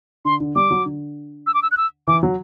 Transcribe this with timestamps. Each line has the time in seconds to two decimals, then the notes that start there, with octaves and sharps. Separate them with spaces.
0.25 D3 C6
0.40 D3
0.55 G3 D6
0.71 F#3
0.85 D3
1.47 E6
1.54 D6
1.62 E6
1.71 F#6
1.77 E6
2.07 E3 D6
2.23 F#3